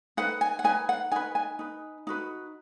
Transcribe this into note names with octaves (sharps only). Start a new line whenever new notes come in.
D#4 B4 F#5
G#5
F#5
D#4 B4 G#5
F#5
D#4 B4 G#5
G#5
D#4 B4
D#4 F#4 B4